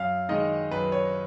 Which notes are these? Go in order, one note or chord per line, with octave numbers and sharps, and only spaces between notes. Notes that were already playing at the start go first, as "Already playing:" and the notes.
Already playing: F#2 F5
D#3 G#3 D#4 D#5
F#2 B4
C#5